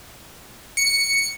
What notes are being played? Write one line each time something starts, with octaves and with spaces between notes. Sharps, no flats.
C#7